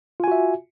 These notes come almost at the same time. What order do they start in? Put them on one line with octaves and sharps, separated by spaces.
F4 G#5 F#4 E5